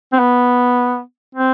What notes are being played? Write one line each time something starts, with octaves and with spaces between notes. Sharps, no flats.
C4
B3
C4